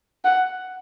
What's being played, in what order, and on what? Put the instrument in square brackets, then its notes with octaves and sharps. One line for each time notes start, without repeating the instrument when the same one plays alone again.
[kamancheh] F#5